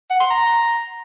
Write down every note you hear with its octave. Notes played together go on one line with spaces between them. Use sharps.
F#5
C6
A#5